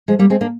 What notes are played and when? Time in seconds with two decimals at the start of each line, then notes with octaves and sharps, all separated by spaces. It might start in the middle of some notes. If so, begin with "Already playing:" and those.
0.08 F3 G#3
0.19 G3 A#3
0.30 G#3 C4
0.41 A#3 D4